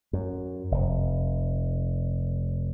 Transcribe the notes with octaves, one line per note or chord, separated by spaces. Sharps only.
F#2
F1